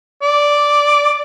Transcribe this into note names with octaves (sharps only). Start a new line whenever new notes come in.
D5